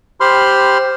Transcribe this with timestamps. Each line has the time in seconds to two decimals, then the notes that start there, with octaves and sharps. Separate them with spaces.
0.20 G4 C5 B5 C6 F6